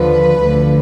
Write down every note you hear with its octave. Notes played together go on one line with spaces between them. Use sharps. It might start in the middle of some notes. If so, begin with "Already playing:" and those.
Already playing: D#2 D3 F3 B4
D2 D3 F3